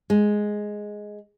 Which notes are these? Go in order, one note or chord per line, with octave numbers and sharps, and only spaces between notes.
G#3